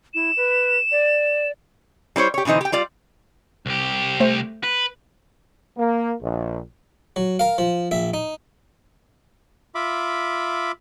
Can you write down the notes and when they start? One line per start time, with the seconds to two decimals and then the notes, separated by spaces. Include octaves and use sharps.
0.14 E4 E7
0.36 B4
0.91 D5
2.16 G3 E4 C5 C#5
2.34 G4 C#5
2.45 B2 D3 E3 D#4 C5
2.61 G4 G5
2.72 G3 F4 D5
3.66 C2 G4
4.20 A3 C5
4.63 B4
5.78 A#3
6.22 A#1
7.16 F#3
7.39 A#4 F5
7.58 F3
7.91 A#1 E5
8.14 D#4
9.75 F4 E5 B5 D6